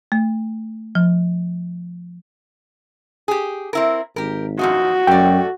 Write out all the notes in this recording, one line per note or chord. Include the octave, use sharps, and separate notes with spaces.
A3
F3
G4 G#4
C4 E4 A#4
G#1 G4 A#4
F#2 F3 D#4 F#4
F#2 A3 D5 G5